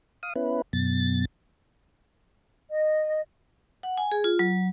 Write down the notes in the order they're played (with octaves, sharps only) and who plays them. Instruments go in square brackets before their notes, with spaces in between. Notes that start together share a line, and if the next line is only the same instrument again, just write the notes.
[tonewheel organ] F5 D#6
B3 C#4 E4 B4
F#2 B2 A6
[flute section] D#5
[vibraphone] F#5
G#5
G#4
F4
F#3